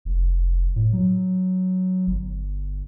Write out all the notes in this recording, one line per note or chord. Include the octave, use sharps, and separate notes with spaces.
F1
A2
F#3
G1